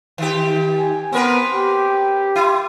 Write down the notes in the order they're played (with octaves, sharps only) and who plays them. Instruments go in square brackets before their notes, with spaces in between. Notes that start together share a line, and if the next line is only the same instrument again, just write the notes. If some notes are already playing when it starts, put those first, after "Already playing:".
[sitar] D#3 G4
[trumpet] G#5
[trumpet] B3 [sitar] C4 A#4 B4
[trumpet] G4
[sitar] E4